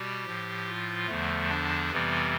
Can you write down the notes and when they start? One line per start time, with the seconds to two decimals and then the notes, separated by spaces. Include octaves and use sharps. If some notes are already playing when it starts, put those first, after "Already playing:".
Already playing: B2 G3 G4
0.25 A2 F3
0.67 F4
1.07 E2 D3 F3 A3
1.49 D4
1.90 F2 C3 E3 G3 B3